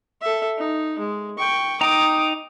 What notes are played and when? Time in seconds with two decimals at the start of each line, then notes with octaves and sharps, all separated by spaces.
0.22 A4 E5
0.57 D#4
0.99 G#3
1.38 G5 C#6
1.81 D#4 G5 A#5 D6 D#6